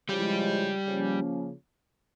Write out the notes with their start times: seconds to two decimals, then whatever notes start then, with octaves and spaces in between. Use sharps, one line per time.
0.09 C#3 F3 G3 G#3 E4 G4
0.88 C#3 F3 A#3 C#4